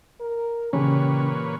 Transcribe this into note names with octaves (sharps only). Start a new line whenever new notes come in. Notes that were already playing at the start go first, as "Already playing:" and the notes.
A#4
A#2 C#3 E3 C#4 G4 B4 C#5